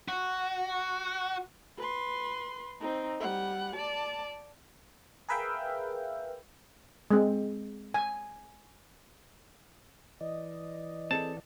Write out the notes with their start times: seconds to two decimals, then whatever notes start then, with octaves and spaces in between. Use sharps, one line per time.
0.08 F#4
1.78 B4 C6
2.80 C4 D#4
3.20 G3 F#5
3.75 D5 A5
5.28 G#4 A#4 B4 E5 F5 G5
7.11 G#3 C4
7.94 G#5
10.21 E3 D5 D#5
11.11 C4 G#4 A4 A5